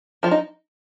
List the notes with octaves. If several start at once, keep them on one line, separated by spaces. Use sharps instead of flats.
F3 F4
D#4